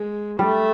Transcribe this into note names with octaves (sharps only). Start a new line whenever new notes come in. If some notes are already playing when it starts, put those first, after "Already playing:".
Already playing: G#3
G3 A3